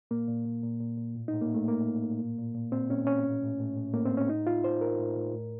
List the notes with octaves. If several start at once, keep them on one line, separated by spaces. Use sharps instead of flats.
A#2 A#3
A#2
A#2
A#2
A#2
A#2
A2
A2 D#4
A#3
A2 A3
A2 A#3
A2
A2
A#2
A#2
A#2
A#2 C4
A#2 C#4
A#2 C#4
A2
A2
A2
A2
A2 A#3
C4
A2
C#4
A2 D#4
A2 F4
A2 C5
A2 A#4
A2
A2
A2